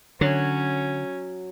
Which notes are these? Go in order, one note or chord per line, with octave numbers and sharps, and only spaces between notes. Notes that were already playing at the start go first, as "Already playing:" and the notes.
D3 F#3 C#4